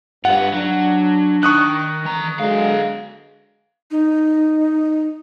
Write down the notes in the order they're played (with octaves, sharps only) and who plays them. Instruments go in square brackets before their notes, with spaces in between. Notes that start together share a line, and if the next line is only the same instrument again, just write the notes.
[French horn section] G2 [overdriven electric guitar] F4 B4 [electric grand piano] F#5
[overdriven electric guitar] F#3 [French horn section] D4
[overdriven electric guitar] D#3 [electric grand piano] C#6 D#6 F#6
[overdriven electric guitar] E3 A#5
[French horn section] D3 F#3 G#3 [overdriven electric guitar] B3 F5
[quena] D#4